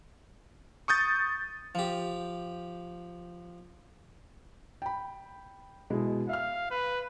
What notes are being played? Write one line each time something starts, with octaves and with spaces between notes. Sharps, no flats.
C#6 D#6 G6 A6
F3 G4
G5 B5
B2 G#3 E4
E5 F5 F6
B4